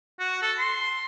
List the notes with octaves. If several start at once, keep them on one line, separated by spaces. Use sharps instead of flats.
F#4
A4
C6